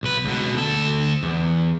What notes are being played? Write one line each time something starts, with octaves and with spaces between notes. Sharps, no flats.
B1 B4
C#2 B2
D2 A4
E2